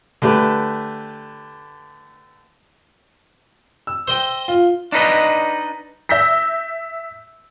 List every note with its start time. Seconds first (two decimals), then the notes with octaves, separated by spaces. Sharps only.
0.22 D3 A3 G4 B4
3.87 E6
4.08 C5 D#5 G5
4.48 F4
4.92 D4 D#4 B4 D#5
6.09 E5 E6 G6 A#6 B6